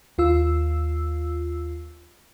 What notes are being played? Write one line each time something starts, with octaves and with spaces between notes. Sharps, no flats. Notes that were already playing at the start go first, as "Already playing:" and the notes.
D#2 F4 E6